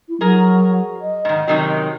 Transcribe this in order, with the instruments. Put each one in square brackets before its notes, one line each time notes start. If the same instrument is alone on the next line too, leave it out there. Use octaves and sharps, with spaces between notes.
[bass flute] E4
[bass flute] F#3 [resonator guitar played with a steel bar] G#4 A#4
[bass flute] D#5
[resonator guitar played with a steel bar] G#2 D#3
C3 D#3 F#3